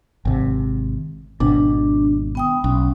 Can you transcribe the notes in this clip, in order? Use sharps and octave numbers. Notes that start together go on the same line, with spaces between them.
G#1 C3
G#1 B2 D4
B3 G5 D#6
B1 C#4